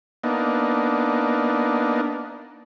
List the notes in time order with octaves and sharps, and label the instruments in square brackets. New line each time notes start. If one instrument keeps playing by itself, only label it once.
[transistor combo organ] A#3 B3 D4 D#4